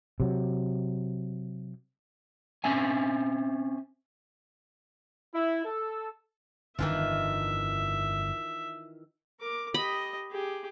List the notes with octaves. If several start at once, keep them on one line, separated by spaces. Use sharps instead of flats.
C3 F#3
C4 C#4 E5 G#5
E4
A4
G1 F2 D#3 E3 D4 F4 E5
A#4 D6
G4 D#5 B5
G4 G#4